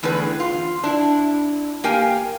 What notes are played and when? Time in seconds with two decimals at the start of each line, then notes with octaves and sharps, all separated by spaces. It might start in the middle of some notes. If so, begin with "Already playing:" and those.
0.03 E2 A2 D3 G#4 B4
0.40 F4
0.84 D4 E4
1.84 A#3 G4 A#4 F5 G5 G#5